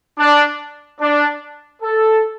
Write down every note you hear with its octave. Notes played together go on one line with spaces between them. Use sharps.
D4
D4
A4